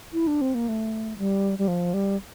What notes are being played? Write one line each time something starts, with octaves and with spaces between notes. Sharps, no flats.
E4
D4
C4
A#3
A3
G3
G3
F3
G3